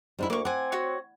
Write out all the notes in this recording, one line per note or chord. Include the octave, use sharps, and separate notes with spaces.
G#2 G3 D4 E4
D2 A#3 C#6 D6
C4 F#5 G#5 D6
F#4 C#5 C#6